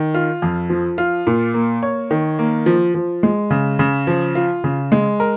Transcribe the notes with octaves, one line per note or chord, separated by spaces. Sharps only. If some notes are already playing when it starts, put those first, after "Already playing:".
Already playing: D#3
F4
F2
F3
F4
A#2
A#3
C#5
D#3
A#3
F3
F3
G#3
C#3
C#3
F3
F4
C#3
G#3
A#4